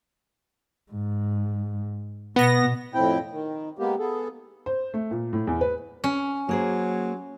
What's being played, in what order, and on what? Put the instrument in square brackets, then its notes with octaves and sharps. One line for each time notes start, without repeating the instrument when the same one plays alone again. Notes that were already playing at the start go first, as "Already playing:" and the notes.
[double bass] G#2
[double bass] B2 [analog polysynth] B3 A#6
[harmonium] F2 A2 C4 E4 G5
D#3
G#3 A#3 B3 G4
B3 G#4 A4
[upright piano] C5
A3
A#2
A2
E2
B4
[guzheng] C#4
[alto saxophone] F#3 [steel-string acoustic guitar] A#3 G#4 C5